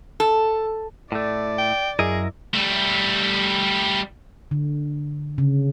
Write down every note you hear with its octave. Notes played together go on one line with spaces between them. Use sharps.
A4
A2 A3 D5
G5
F#2 E4 G#4 A#4 D#5
G3 A3
D3
C#3